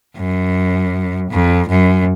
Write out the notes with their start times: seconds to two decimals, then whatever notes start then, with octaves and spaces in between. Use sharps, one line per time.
0.17 F#2
1.31 F2
1.69 F#2